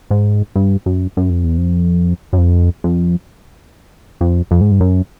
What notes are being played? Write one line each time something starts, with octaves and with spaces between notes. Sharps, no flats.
G#2
G2
F#2
F#2
F2
E2
F2
F#2
F2
F2
F2
F2
G#2
G2
F#2